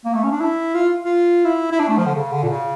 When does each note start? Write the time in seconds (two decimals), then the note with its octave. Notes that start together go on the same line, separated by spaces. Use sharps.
0.05 A#3
0.14 A3
0.23 C#4
0.32 D4
0.40 E4
0.75 F4
1.03 F4
1.45 E4
1.72 E4
1.80 D4
1.88 A3
1.98 F3
2.06 D3
2.15 C#3
2.32 D3
2.43 A#2
2.49 C#3